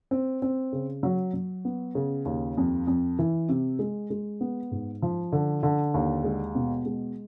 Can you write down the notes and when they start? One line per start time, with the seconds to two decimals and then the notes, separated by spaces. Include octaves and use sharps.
0.11 C4
0.42 C4
0.73 C#3
1.03 F#3
1.34 F#3
1.65 B3
1.95 C#3
2.25 D#2
2.57 F2
2.87 F2
3.19 E3
3.49 C3
3.79 G#3
4.10 G#3
4.41 B3
4.71 G#2
5.02 F3
5.32 D3
5.63 D3
5.94 D#2
6.24 G#3
6.55 B2
6.86 G#3